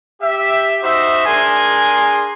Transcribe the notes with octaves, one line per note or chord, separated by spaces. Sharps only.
G4 E5
D#4 F#4 C5 E5
D4 G#4 A#4 G#5 C6